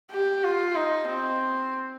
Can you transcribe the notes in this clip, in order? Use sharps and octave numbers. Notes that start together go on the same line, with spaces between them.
G4
F4
D#4
C4